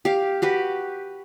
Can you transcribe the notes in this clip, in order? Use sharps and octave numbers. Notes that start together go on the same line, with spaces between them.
G4 F5
F#4 G4 B4